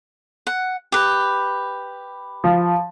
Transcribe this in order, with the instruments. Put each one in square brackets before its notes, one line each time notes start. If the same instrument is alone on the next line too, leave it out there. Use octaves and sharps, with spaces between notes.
[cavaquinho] F#5
G4 B4
[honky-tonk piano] F3